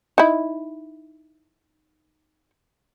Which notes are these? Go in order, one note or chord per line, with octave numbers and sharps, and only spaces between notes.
D#4 E4